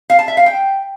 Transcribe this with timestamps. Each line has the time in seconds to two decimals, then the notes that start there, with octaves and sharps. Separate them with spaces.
0.10 F5
0.19 A5
0.28 E5
0.37 F5
0.46 G5